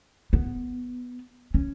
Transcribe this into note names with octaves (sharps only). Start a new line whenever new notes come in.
B3
C#4